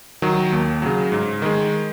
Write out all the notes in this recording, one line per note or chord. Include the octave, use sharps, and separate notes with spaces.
D#3 F#3
D#2
C#3 F#3
G#2
D#3 G#3